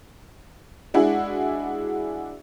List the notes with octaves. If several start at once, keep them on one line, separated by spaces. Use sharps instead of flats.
G#3 D4 E4 F#4 G#4